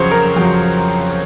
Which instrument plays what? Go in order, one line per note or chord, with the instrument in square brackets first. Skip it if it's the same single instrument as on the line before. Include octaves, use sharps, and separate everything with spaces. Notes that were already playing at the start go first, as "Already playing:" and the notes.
Already playing: [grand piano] F2 C#3 F#3 C5 C#5
A#4
F2 C#3 F#3